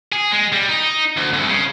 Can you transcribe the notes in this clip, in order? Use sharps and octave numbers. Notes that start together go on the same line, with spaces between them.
G#4
G#3
G3
D#4
D2
C2
C#3